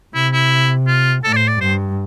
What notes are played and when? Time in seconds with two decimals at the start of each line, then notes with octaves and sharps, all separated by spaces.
0.14 C3 E4
0.33 E4
0.87 F4
1.24 A2 A4
1.33 D5
1.37 C5
1.48 D5
1.60 G2 C5